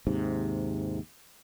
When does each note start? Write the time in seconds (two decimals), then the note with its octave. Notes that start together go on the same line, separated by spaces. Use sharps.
0.07 D#2 G#2 C3